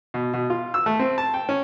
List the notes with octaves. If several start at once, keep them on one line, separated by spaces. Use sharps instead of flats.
B2
B2
F4
E6
A3
C4
A5
G5
C#4